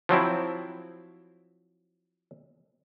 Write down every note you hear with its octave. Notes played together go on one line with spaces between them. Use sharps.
F3 F#3 C4 E4